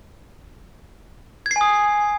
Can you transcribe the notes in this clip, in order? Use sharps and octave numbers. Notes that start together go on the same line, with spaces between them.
G#6
C7
G#5
D#6